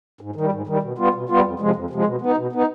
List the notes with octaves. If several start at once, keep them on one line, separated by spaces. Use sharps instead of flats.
G#2
D#3 G3
G#2
D#3 G3
B2
G3 B3 F4
B2
G3 B3 F4
F2
C3 F3 G#3
F2
C3 F3 G#3
B2
B3 D#4
B2
B3 D#4